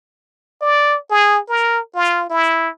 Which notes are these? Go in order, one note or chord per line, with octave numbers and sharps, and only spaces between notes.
D5
G#4
A#4
F4
E4